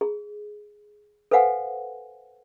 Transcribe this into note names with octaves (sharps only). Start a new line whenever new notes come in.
G#4
A4 B4 C5 F5 F#5 G#5